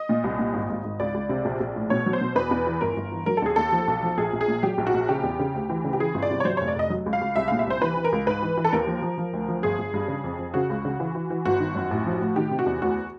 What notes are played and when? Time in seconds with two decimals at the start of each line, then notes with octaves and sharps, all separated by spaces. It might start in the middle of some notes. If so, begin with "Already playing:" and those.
Already playing: D#5
0.09 A#2
0.24 C2
0.39 A#2
0.53 G#1
0.70 G#1
0.84 G#1
1.00 C#2 D5
1.14 C#2
1.29 C3
1.45 A#1
1.60 A#1
1.76 A2
1.90 B2 C#5
2.06 F#3
2.13 C5
2.21 B2
2.35 E2 B4
2.51 E2
2.67 E3
2.81 G1 A#4
2.97 G1
3.12 E3
3.26 F#3 A#4
3.37 A4
3.42 D#2 G#4
3.56 D#2 A4
3.72 F3
3.88 B1
4.03 F3
4.18 A#1 G#4
4.33 A#1
4.41 G#4
4.48 A#2
4.63 F#3 G4
4.78 A#1
4.87 F#4
4.94 A#1
5.09 C#3 G4
5.23 E2
5.39 C#3
5.55 D2
5.70 E3
5.84 C#3
5.93 G4
6.00 E3 G#4
6.14 G1
6.23 D5
6.30 C3
6.40 C#5
6.45 F#3 C5
6.57 F1 C#5
6.68 D5
6.75 F1 D#5
6.90 F#3
7.06 C#2
7.13 F5
7.21 C#2
7.36 C2 E5
7.48 A#2 F5
7.59 E5
7.67 C2 C5
7.82 E3 B4
7.97 E3
8.04 A#4
8.12 C#2
8.26 G#2 B4
8.42 E3
8.57 E3
8.64 A4
8.73 D#2 A#4
8.87 F3
9.02 F3
9.18 F3
9.33 D2
9.48 F3
9.63 G1 G#4
9.79 G1
9.94 G2
10.08 C#3
10.24 F2
10.39 F2
10.54 C#3 F#4
10.70 C#2
10.85 C#3
11.00 E3
11.15 E3
11.30 E3
11.45 G1 F#4
11.60 D#3
11.76 F#2
11.91 A1
12.06 F3
12.21 A2
12.36 D#3 G4
12.51 C3
12.59 F#4
12.66 E2
12.81 D2 F#4